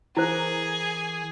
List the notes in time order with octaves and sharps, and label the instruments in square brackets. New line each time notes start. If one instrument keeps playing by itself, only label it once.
[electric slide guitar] E3 A#4 [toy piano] E4 C5 [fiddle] G#4